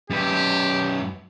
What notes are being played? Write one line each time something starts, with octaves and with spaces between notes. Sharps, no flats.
F#2 G4 B4